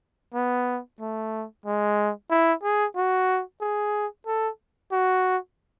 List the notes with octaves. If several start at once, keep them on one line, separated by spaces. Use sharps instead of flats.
B3
A3
G#3
E4
G#4
F#4
G#4
A4
F#4